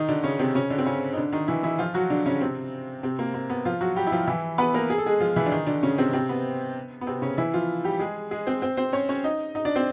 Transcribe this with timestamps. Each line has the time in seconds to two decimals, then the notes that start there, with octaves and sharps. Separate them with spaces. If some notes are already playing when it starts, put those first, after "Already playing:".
Already playing: D#3 D#4
0.09 D3 D4
0.24 C#3 C#4
0.39 C3 C4
0.55 C#3 C#4
0.70 D3 D4
0.78 C4
0.86 C#3 C#4
1.13 D#4
1.17 D3 D4
1.32 D#3 D#4
1.48 E3 E4
1.63 E3 E4
1.79 F3 F4
1.94 F#3 F#4
2.10 D3 D4
2.26 C#3 C#4
2.41 C3 C4
3.03 C3 C4
3.19 A#3
3.34 A#3
3.50 B3
3.65 F3 F4
3.81 F#3 F#4
3.96 G3 G4
4.07 E4
4.12 F3 F4
4.27 E3 E4
4.58 B3 B4
4.74 A#3 A#4
4.90 G#4
4.98 A4
5.06 G#3 G#4
5.20 F3 F4
5.36 E3 E4
5.46 D4
5.52 D#3 D#4
5.67 D3 D4
5.83 C#3 C#4
5.98 C3 C4
6.13 C3 C4
6.29 B3
7.01 B3
7.07 C3 C4
7.22 C#3 C#4
7.38 E3 E4
7.54 F3 F4
7.84 G3 G4
8.00 G#3 G#4
8.31 G#3 G#4
8.47 C4 C5
8.62 C4 C5
8.77 C4 C5
8.93 C#4 C#5
9.09 C#4 C#5
9.24 D#4 D#5
9.55 D#4 D#5
9.65 D4 D5
9.76 C4 C5